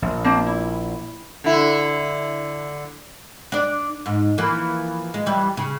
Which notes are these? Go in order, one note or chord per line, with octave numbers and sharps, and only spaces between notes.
A#1
A#3 C4 D4
E4
D3 E4
D4 D5
G#2
E3 F3 A#3
G#3
E3 G3
C#3